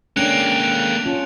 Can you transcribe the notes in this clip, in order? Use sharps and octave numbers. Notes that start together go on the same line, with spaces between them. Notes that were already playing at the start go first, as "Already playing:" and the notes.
G#3 A#3 C#4 D4 G5 F#6 C#7 F7
C#4 F4 A5